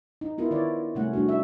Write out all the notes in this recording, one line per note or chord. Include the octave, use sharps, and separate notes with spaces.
D#4
B3 E4 F4 A#4
D#3 E4 C#5 D5
C3 G3 A3 C#4 F#5
G3 A3 D4 F#4
D#4 E5